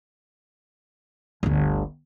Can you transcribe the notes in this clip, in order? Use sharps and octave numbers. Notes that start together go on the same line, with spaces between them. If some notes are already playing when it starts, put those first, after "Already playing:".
G1 D2